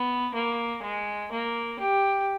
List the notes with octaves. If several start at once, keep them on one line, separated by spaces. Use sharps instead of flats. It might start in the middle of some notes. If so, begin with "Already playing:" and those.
Already playing: B3
A#3
G#3
A#3
G4